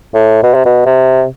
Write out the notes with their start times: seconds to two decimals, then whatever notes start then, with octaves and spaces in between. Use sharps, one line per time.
0.14 A2
0.43 B2
0.54 C3
0.65 B2
0.86 C3